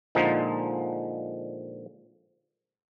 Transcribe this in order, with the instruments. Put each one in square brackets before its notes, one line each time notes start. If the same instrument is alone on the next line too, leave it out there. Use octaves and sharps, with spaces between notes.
[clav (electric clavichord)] A#2 D3 F3 G#3 D#4